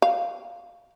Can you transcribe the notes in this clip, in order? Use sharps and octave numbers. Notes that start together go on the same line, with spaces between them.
F5